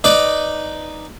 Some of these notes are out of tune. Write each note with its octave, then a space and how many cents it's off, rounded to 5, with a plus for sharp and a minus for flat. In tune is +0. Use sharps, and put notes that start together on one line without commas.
D#4 +0 B4 +10 D5 +0